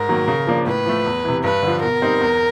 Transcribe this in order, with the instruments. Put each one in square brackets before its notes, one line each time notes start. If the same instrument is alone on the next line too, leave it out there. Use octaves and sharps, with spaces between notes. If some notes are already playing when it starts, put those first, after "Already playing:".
Already playing: [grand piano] G#2 [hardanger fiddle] A#4
[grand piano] D#3 F#3 A#3
C#3
F3 A#3 D4
[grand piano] A2 [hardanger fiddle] B4
[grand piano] F3 A3
E2
C3 E3
[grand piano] G2 [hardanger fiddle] B4
[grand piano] D3 F3
[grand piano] B2 [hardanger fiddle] A#4
[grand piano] G3 C4 D#4
E2